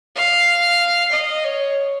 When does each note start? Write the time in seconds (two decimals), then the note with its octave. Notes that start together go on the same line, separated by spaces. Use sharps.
0.16 F5
1.12 D#5
1.44 C#5